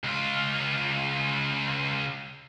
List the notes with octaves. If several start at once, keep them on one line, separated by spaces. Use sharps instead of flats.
C#2 F4